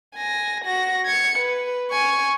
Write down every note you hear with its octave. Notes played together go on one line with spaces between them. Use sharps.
G#5 A#6
F#4 A#6
G#6 C#7
B4
G#5 C#6